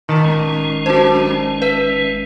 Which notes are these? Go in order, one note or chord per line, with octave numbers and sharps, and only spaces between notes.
A2 D#3 A5
G1 G#3 C#4
F#2 F#4 C5
B4 E5